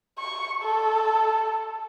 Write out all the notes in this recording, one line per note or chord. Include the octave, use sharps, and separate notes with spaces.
C#6
A4